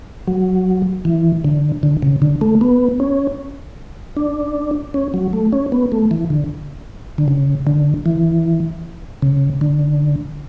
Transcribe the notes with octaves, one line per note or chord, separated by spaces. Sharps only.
F#3
E3
D3
D3
C#3
D3
A3
B3
C#4
D4
C#4
F#3
A3
C#4
B3
A3
E3
D3
D3
C#3
D3
E3
C#3
D3